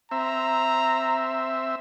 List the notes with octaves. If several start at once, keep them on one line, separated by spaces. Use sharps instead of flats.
C4 E5 A#5